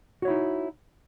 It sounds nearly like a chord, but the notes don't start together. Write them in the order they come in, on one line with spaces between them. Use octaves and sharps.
F#4 C#5 E4 D#4